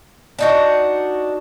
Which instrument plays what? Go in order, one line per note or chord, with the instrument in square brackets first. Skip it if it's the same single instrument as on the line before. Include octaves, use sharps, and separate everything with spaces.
[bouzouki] D4 D#4 F#4